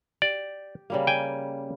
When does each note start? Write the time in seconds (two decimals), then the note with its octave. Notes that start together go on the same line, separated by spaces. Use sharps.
0.22 G4 D5
0.90 C#3 G3 A#3
1.07 G5 G#5